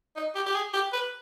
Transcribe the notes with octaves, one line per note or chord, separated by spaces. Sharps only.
D#4
G4
G4
G#4
G4
B4